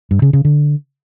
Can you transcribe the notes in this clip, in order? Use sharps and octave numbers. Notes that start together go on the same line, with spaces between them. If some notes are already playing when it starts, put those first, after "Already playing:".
G2
C#3
C#3
D3